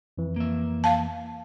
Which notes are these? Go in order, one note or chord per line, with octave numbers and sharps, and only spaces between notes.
F2 E3
A#3 E5
F5 A5